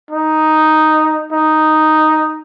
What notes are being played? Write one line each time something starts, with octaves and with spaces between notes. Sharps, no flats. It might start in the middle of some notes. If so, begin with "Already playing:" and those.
D#4
D#4